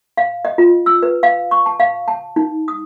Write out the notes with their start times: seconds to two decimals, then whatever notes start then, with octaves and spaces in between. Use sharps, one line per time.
0.17 F5
0.45 D#5
0.58 F4
0.86 E6
1.03 B4
1.23 F5
1.51 C#6
1.66 A5
1.80 F5
2.08 A5
2.36 D#4
2.68 D#6